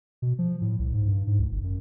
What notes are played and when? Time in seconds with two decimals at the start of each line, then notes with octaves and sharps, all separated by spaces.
0.22 B2
0.39 F3
0.62 A2
0.79 C2
0.93 G#2
1.08 G2
1.27 G#2
1.39 C#2
1.51 G1
1.64 F#2